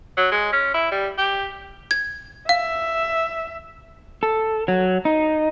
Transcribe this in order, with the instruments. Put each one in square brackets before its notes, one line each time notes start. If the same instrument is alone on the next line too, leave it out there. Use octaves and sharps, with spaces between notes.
[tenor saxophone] F#3
G#3
C#4
E4
G3
G4
[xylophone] G#6
[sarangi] E5 [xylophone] F5
[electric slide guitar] A4
F#3
D#4